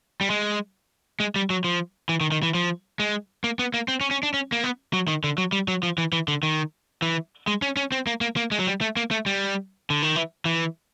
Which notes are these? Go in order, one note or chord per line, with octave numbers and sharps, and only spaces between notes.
G3
G#3
G#3
G3
F#3
F3
E3
D#3
D#3
E3
F3
G#3
A#3
B3
A#3
C4
C#4
C#4
D4
C#4
A#3
B3
F#3
D#3
D3
F#3
G3
F#3
F3
E3
E3
D3
D#3
E3
G#3
C#4
C#4
C4
A#3
A#3
A#3
G#3
F#3
G3
A3
A#3
A3
G3
D3
D#3
E3
E3